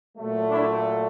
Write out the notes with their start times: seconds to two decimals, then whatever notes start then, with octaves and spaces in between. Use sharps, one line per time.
0.18 A#2 F#3 A3
0.49 D4 E4